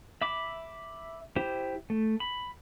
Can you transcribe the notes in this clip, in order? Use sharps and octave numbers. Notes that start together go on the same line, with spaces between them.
E5 B5 D6
E4 G4 C5
A3
B5